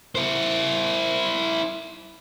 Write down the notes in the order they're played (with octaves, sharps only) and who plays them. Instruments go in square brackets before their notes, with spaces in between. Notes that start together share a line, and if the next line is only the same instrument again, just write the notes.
[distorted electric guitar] E4 C5